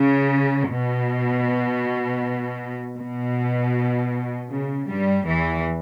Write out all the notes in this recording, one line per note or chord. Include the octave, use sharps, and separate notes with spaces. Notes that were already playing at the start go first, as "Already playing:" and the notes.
Already playing: C#3
B2
B2
C#3
G2 G3
E2 E3